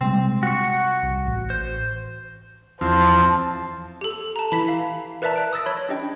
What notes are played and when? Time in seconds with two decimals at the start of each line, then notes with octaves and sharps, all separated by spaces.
0.01 C3 G3 G#3 C4
0.43 F#4 C#6
1.03 C2
1.26 A1
1.50 C5
2.81 E2 F3 C4 C5 A5
4.01 G4 A4
4.36 A5 A#5
4.52 E3 B5 B6
4.68 F5
5.22 A#4 B4 D5 E5 A5 A#5
5.36 F#6 D7
5.53 D#6 E6 A6 A#6
5.66 C#5 B5
5.89 C#4 D4 G4 D#5 G5